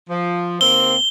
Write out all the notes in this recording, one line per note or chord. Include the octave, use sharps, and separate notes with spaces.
F3
D#2 A#3 C4 G7